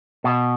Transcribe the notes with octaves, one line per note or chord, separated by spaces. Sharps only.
B2